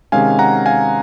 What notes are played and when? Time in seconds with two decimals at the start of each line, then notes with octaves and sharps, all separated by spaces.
0.12 C3 D#3 G#3 C#4 F5 G#5
0.39 F#5 A#5
0.66 F5 G#5